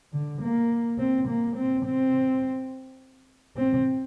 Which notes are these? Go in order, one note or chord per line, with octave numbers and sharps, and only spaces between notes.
D3
A#3
C4
A#3
C4
C4
C4